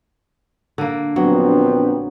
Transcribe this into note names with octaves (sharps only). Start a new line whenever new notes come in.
D3 A#3
A#1 F#3 B3 C4